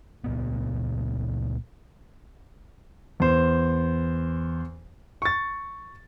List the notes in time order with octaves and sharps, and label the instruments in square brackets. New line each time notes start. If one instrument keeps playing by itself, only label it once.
[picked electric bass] C#2 A#2 B3
[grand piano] E2 C5
C#6 A6